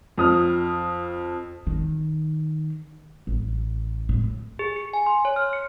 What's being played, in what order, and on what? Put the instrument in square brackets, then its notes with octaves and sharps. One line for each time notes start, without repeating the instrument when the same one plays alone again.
[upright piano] F2 D#6 F6
[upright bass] D#3
A1
A2
[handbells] G#4
C#7
G#5
C6
C#5
F6
C#7